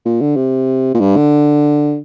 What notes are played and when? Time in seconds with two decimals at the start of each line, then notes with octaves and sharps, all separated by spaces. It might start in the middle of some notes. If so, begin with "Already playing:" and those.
0.05 A#2
0.21 D3
0.36 C3
0.95 A#2
1.00 G2
1.16 D3